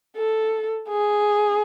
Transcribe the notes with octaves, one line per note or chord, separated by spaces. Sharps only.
A4
G#4